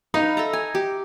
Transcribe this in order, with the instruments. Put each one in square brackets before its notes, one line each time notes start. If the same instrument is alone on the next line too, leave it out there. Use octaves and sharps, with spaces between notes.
[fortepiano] D#4 [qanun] B4 F5
[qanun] A4 E5 A#5
G#5
G4